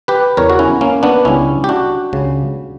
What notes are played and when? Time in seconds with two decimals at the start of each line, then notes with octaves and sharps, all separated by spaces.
0.08 G4 B4
0.37 E2 C#3 G3 A#4 C#5
0.50 F#4
0.59 C#4 E4
0.81 A#3 C#4
1.03 B3 D4
1.25 C#2 C#3 G3 C#4 E4
1.64 G4
1.69 D4 F#4
2.13 C#2 C#3 G3